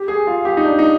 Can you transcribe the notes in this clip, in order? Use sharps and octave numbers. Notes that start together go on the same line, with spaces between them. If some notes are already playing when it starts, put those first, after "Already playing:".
Already playing: G4
G#4
F4
G4
D#4
D4
D#4